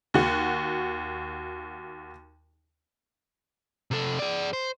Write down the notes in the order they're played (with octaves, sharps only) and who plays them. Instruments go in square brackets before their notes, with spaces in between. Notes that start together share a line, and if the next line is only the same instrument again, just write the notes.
[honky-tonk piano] D#2 F#4
[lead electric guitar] C3 A4
G#4 D5
C5